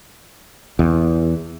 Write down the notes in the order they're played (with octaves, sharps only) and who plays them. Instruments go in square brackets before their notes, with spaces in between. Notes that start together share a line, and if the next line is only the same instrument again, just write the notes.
[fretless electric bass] E2